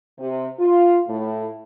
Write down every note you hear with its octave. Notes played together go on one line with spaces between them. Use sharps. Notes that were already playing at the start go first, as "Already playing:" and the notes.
C3
F4
A2